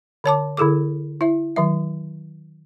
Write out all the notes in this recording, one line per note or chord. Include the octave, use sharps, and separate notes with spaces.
D3 C#5 A5 D6
D3 E4 G#4 A4 D6
E4 E5
D#3 F#3 E5